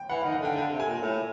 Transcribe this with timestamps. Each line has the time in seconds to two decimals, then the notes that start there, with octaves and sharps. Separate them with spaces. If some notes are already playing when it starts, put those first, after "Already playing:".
Already playing: G5
0.09 E3 F#5
0.21 F5
0.24 D#3
0.32 F#5
0.41 D3 G5
0.56 D3 G5
0.71 C3
0.80 G#5
0.88 A#2
1.02 A2